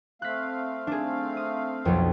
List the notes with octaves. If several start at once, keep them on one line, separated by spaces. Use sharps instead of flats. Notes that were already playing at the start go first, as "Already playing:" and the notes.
A3 C4 F5 F#6 B6
D4 G#4
D#6
B1 F2